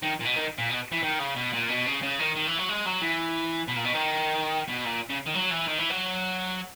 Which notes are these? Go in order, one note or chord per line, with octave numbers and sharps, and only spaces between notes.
D#3
A#2
B2
D#3
A#2
B2
E3
D#3
C#3
B2
A#2
B2
C#3
C#3
D#3
D#3
E3
F#3
G#3
F#3
E3
B2
A#2
B2
D#3
B2
A#2
C#3
D#3
F#3
E3
D#3
E3
F#3